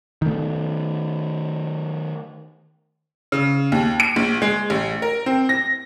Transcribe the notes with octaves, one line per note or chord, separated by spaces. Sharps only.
D#3 A3
C#3
D#2
D7
A#1
G#3
A1
A#4
C4
A#6